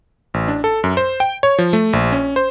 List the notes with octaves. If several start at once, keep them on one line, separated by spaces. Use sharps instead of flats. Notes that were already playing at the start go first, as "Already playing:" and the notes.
A1
D4
A4
F#2
C5
G5
C#5
F3
A3
A#1
C#4
C5